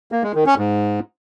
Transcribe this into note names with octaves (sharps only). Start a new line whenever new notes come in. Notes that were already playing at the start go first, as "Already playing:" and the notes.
A#3
G#3
D#3
C#4
G#2